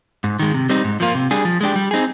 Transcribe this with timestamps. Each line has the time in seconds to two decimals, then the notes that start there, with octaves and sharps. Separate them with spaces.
0.24 G#2
0.39 D#3 G#3
0.54 C3
0.69 G3 C4 D#4
0.84 G#2
1.00 F3 A#3 F4
1.15 C3
1.31 G3 D4 G#4
1.45 F3
1.61 G#3 D4 G4
1.76 G3
1.91 C4 D#4 G#4